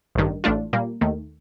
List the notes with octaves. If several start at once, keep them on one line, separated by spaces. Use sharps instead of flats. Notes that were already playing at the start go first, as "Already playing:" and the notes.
A1 G2 D#3
A1 A2 A3 D4 F4
A#2 G3 A#3
D#2 D#3 A3